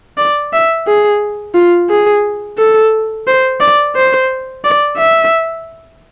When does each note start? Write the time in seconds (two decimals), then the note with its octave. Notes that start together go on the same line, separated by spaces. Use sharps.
0.18 D5
0.53 E5
0.87 G#4
1.55 F4
1.90 G#4
2.58 A4
3.27 C5
3.61 D5
3.96 C5
4.64 D5
4.97 E5